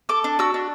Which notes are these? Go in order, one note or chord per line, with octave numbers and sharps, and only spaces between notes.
A4 D6
D4
F#4 E6
D4